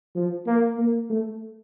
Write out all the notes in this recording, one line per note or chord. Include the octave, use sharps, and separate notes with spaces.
F3
A#3
A#3
A3